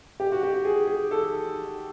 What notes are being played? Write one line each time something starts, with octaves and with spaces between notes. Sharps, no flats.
G4
F#4
G4
G#4
G#4
A4